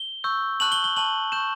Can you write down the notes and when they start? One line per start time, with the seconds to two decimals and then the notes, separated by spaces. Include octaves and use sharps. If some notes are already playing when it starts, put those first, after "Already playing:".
Already playing: G7
0.24 C#6 E6 G6
0.60 A5 C#6 F#6 F#7
0.72 G7
0.84 G7
0.96 A5 C#6 F#6 F#7
1.32 C#6 G6 E7